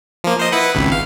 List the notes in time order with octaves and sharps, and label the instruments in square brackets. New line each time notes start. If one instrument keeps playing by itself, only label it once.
[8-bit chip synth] F3 A#3
C5 D#5
E4 B4 F#5
G#1 C#2
F5